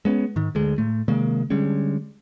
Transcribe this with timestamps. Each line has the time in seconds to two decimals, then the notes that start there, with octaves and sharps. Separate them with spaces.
0.05 G#3 B3 C#4
0.36 G#2 D#3
0.55 D2 D3 G#3
0.78 A2 A3
1.08 C3 D#3 G#3 A#3
1.50 D3 G3 G#3 C#4